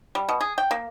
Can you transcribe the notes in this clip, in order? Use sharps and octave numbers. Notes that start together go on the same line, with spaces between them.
G3
B2
G#4
G5
A#3